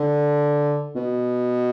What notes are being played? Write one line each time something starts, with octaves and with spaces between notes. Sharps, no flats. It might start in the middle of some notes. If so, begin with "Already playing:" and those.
Already playing: D3
B2